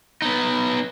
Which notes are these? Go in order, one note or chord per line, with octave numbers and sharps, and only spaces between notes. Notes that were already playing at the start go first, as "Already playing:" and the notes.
B3 D#4